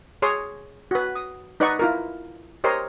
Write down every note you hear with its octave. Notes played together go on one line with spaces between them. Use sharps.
G#4 C#5 C6 D#6
F#4 B4
D#6
D#4 B4 D5 D#5 F#5 C#6
E4 F4 A#4
G4 A#4 C5 C#5 D#5 C6